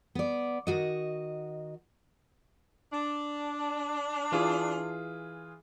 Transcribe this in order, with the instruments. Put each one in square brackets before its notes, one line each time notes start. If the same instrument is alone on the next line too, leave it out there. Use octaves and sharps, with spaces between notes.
[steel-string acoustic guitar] B3 D5
D#3 F#4 D#5
[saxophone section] D4
[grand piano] E3 F4 G#4